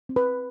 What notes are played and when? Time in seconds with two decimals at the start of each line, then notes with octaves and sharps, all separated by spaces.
0.09 C4
0.16 B4 B5